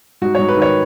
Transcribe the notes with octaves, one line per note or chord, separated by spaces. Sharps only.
G#2 F#4
G#2 C#5
B4
D#3 C#5